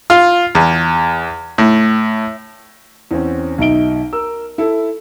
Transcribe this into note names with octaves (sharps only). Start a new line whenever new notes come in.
F4
E2
A2
E2 C4 C#4
B1 D#3 D#4 E5 D7 G7
A#4 E6
E4 A4